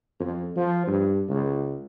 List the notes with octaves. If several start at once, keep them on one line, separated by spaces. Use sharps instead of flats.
F2
F3
G2
C#2